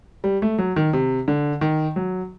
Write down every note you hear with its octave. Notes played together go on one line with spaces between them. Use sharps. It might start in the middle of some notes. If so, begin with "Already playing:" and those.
G3
A3
F#3
D#3
C3
D3
D#3
F#3